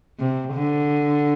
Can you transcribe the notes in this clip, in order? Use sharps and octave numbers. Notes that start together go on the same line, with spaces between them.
C3
D3